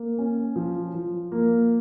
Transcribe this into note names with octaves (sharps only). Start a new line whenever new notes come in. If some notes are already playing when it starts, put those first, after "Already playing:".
Already playing: A#3
C#4
F3
F3
A#3